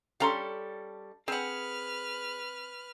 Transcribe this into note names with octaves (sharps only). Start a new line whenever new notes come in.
G3 C#4 A4 F5 A#5 C6
C4 G#4 B4 F#5 F6